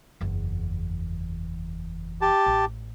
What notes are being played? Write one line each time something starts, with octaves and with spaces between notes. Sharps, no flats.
F#1 E2
G4 A5
A1